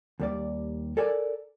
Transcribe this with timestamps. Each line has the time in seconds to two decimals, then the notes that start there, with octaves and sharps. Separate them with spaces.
0.20 D#2 G3 D5
0.97 A4 A#4 D5 G#5